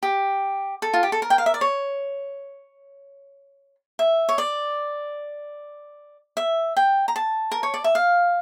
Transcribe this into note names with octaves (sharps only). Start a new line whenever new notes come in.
G4
A4
F4
G4
A4
A#4
G5
F5
E5
D5
C#5
E5
C#5
D5
E5
G5
A#5
A5
A#4
C#5
D5
E5
F5